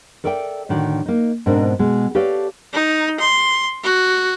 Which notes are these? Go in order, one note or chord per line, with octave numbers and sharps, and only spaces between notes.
A4 A#4 D5 E5 F#5 G5
A2 D3 D#3 D4 F#4
A#3 D#4
G#2 B2 C4 D4 A#4
B2 G#3
G4 A4 B4 C#5 D5 F5
D#4
C6
F#4